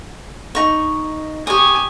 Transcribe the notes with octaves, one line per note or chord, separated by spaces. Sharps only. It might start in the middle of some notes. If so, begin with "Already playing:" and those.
D#4 C#6
G4 G#5 C#6 D#6